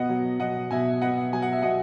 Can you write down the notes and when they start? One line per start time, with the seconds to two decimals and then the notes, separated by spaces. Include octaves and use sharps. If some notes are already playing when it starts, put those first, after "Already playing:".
Already playing: B2 B3 D#5 F#5
0.09 F#3
0.40 B2 D#5 F#5
0.71 B2 E5 G#5
1.02 B3 D#5 F#5
1.33 F#3 G#5
1.42 F#5
1.53 E5
1.62 B2 D#5 F#5